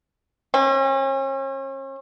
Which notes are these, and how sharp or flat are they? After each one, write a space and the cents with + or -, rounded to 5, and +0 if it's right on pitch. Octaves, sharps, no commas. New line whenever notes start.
C#4 -40